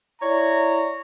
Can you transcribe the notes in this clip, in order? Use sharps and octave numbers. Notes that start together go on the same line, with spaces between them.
E4 C#5 D5 A#5